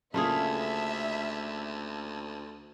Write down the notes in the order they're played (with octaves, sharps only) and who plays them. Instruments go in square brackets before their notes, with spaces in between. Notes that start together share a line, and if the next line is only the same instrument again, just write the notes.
[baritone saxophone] D2 [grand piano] C#3 A#3 [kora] A3 F4 G#4 [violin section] E5